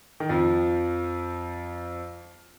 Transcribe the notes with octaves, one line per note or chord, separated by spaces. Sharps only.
D#3
F2 F3